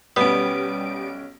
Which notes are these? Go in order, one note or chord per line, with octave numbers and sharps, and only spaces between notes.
B1 G3 B3 C#4 D7